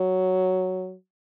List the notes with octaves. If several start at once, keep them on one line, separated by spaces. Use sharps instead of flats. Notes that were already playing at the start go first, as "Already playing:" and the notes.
Already playing: F#3